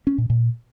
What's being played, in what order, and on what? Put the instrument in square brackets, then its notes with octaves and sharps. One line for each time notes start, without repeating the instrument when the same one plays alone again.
[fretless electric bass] C#4
A#2
A#2